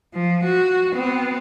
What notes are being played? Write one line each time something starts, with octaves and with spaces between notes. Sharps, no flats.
F3
F#4
B3 C4